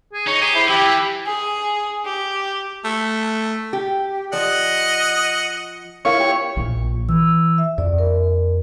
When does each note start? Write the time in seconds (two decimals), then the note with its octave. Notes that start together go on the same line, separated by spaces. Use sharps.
0.13 G#4
0.27 D#4 C#5
0.41 G4 G#4
0.55 E4 C5
0.68 E3 E4 G4
1.26 G#4
2.05 G4
2.84 A3
3.73 G4
4.33 F3 D5 D#5 F#5
6.05 E4 F4 A#4 C#5 F5
6.20 F4 G4
6.57 A#1 A#2
7.09 E3 E6
7.58 E5
7.78 F2 D5
7.98 A#4